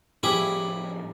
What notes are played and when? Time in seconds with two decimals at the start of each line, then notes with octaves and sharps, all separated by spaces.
0.23 A2 F3 G3 E4 G4 G#4